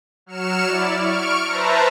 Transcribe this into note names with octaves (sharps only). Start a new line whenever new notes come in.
F#3 F6 C#7 E7
E4 D5
C#6 F6 D7
B4 C5 E5 A5 A#5